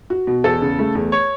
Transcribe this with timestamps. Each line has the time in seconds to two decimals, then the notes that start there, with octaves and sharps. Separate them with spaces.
0.10 F#4
0.27 B2
0.44 E2 A4
0.61 C#3
0.79 A3
0.95 E2
1.12 C#5